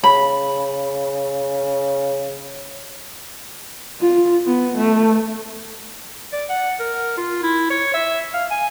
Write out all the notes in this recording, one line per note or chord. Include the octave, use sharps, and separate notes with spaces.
C#3 B5
F4
B3
A3
D5
F#5
A#4
F4
E4
C#5
E5
F5
G#5